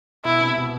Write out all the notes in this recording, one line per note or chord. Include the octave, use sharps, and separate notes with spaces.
B2 E4
C3
B2